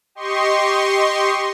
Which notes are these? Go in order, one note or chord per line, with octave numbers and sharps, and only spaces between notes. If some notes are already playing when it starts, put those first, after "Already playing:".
G4 D#5 C6 C#6